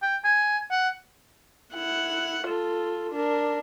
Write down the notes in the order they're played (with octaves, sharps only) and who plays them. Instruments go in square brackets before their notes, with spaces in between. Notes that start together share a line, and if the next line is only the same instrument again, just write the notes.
[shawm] G5
G#5
F#5
[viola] E4 F#5
F4 A4
D4 A#4